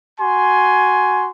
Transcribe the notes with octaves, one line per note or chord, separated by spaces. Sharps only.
F#4 G#5 C6